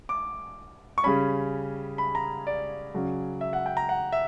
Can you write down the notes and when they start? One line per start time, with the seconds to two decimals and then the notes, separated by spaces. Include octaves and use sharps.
0.09 D6
0.98 C#6
1.04 C#3 G3 C#4 B5
1.98 B5
2.15 A#5
2.47 D5
2.94 C#3 F#3 C#4
3.41 E5
3.53 F#5
3.66 G5
3.77 A#5
3.89 F#5
4.12 E5